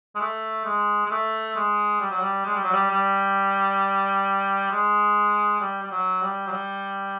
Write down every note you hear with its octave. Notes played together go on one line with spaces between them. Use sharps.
G#3
A3
G#3
G#3
A3
G#3
G3
F#3
G3
G#3
G3
F#3
G3
G3
G#3
G3
G3
F#3
G3
F#3
G3